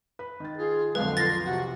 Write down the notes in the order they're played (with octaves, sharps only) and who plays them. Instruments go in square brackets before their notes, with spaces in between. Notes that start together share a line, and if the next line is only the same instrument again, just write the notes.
[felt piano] B4
D#3 A6
[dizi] F4 [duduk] G#4
[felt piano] B1 F2 [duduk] D3 [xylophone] B4 [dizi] F5
[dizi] F4 [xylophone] A6 A#6
[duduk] C3 [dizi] F#4